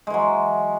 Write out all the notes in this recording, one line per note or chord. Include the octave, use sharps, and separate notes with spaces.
E3 F#3 G#3